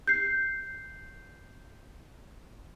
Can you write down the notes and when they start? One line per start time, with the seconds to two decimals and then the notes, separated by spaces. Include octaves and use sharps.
0.07 G6 C7